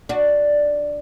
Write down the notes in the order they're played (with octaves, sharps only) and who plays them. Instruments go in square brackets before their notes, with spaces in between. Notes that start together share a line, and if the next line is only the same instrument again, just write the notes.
[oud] D4 F#4